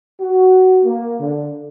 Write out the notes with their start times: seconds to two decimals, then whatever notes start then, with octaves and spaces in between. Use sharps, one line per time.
0.20 F#4
0.85 A#3
1.19 D3